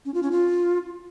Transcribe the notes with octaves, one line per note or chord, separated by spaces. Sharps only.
C#4
F4
C#4
F4